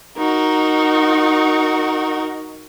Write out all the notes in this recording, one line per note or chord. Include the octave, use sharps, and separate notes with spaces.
D#4 F#4 A#4